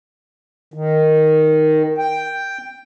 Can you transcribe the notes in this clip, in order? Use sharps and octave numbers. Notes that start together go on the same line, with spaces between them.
D#3
G5